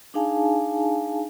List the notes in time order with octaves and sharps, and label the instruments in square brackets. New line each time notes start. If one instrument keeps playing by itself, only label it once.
[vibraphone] D4 D#4 G#4 F5 G#5 A5